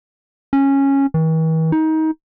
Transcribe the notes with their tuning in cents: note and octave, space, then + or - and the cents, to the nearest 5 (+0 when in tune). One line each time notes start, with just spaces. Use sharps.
C#4 -10
E3 -45
D#4 +25